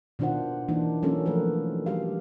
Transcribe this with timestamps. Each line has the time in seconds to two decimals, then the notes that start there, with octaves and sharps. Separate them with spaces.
0.19 B2 D#3 D4 F4 C5 F#5
0.68 E3 A#3 D4 D#4
1.03 F#3 A#3 C#4 F4 A4
1.26 F3 A3 A#4 B4
1.86 G3 G4 F5